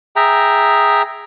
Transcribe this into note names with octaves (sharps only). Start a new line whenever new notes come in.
G#4 E5 G5 A#5